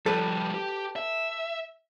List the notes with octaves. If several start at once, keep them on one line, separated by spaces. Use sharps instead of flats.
F3 G3 A4 B4
G4
E5